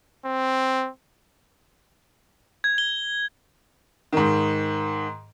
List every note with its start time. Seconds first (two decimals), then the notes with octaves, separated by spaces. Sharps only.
0.25 C4
2.64 G#6
2.78 G7
4.13 G#2 D#3